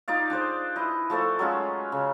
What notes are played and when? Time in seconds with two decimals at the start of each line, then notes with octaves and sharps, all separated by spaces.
0.08 D#4 F4 D5 F5
0.30 D4 G#4 C5 D5
0.76 E4 B4 D#5
1.10 F3 A3 A4 D5
1.39 F#3 G#3 C#4 F4
1.92 C#3